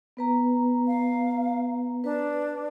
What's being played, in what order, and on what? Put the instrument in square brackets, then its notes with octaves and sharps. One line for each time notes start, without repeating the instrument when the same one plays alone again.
[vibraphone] B3 B4 A#5
[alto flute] F5
[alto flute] D4 [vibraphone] B4